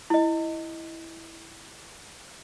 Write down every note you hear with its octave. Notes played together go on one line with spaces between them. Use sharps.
E4 D#5